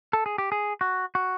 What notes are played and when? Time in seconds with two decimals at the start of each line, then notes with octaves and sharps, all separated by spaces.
0.13 A4
0.26 G#4
0.38 G4
0.52 G#4
0.81 F#4
1.15 F#4